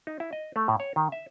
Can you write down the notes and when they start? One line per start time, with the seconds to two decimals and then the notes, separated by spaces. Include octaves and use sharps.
0.07 D#4
0.20 E4
0.33 D#5
0.56 A3
0.68 A2
0.80 C#5
0.96 D#3
1.12 E5